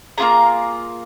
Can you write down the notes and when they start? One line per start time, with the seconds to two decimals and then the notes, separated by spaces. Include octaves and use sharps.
0.18 A#3 D4 F4 G#4 A#5